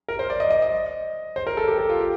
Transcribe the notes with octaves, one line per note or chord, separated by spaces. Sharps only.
A#4
C5
D5
D#5
D#5
D#5
C5
A#4
A4
G4
A4
F4
G4